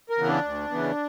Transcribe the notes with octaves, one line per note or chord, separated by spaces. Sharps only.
A#4
C#3 E3 B3
D4
D2
C#3 E3 B3